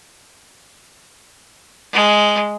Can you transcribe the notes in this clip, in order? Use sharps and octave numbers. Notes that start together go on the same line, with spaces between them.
G#3